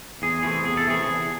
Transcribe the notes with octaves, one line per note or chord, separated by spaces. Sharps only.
E2 G#4
C3 E3 A3 G#4
E2 G#4
A4
C3 E3 A3 G#4
E2